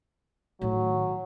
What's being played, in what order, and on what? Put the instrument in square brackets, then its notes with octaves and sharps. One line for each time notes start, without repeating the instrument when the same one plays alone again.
[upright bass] A2 D#3 [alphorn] F#3